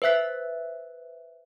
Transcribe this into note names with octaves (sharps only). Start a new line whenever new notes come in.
B4 C5 E5 F#6 B6